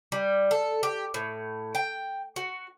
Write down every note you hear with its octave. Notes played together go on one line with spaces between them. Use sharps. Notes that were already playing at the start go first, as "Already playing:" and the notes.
G3
A4
G4
A2
G5
F#4